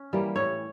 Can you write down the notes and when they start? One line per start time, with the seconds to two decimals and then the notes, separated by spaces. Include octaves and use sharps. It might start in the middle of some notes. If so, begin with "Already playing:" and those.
Already playing: C#4
0.13 E3 G3 A#3
0.36 A2 C#5